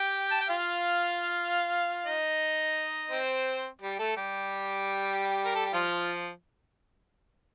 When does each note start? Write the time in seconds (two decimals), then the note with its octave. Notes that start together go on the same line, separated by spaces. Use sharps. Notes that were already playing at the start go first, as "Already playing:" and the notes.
Already playing: G4 G5
0.31 A5
0.40 G5
0.49 F4 F5
2.07 D#4 D#5
3.11 C4 C5
3.82 G3 G4
3.99 A3 A4
4.17 G3 G4
5.46 A#4
5.55 A4
5.65 G4
5.73 F3 F4